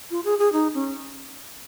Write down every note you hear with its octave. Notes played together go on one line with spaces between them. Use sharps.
F4
G#4
G#4
D#4
C#4